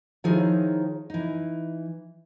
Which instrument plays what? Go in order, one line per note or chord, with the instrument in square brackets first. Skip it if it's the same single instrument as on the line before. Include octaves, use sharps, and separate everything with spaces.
[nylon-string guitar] D#3 F3 D#4 E4 G#4 C#5
E3 D#4